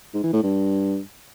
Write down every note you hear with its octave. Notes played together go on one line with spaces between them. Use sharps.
G#2
E3
A2
G2